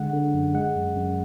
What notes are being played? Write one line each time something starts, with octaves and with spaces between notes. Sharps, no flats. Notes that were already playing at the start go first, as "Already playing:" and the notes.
Already playing: D3 G#3 F#5
D3
F#2
G#3 F#5
F#2
F#2